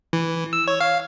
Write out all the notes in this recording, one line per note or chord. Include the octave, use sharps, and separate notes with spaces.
E3
E6
C#5
F5